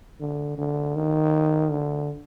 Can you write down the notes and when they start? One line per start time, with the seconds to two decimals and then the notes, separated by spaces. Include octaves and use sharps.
0.20 D3
0.58 D3
0.96 D#3
1.71 D3